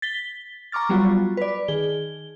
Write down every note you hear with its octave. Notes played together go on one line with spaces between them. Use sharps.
A6 B6 G7
A#5 C#6 D6 F6 A6
F#3 G3 B3 F4 F#4
B4 D5
D#3 G#4 G7